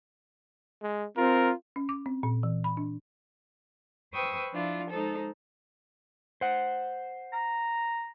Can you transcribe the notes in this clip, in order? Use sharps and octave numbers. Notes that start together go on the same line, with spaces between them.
G#3
C4 F4 A#4
C#4
D6
C4
A#2
E3
B5
D4
B4 C5 G5 C#6 D#6 E6
F3 D4 E4 F4
G#3 D#4 A4 C5
C5 F#5
A#5